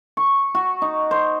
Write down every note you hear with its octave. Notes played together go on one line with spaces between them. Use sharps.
C#6
F#4
D#4
C5